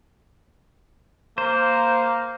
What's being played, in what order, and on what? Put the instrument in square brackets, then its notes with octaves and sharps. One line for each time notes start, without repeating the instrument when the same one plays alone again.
[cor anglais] A#3 [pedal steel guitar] C5